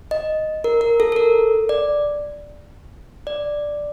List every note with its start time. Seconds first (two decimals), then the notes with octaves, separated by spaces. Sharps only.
0.11 D#5
0.64 A#4
0.81 A#4
1.00 A4
1.12 A4
1.16 A#4
1.69 D5
3.27 D5